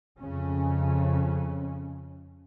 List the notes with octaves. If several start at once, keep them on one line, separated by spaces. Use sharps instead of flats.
F2 C#3 C#4